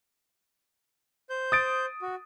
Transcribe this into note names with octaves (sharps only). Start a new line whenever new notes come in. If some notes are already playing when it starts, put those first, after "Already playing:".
C5 G6
D#6 A6 D7
F#4